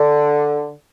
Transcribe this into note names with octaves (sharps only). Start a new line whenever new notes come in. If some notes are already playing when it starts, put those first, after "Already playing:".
Already playing: D3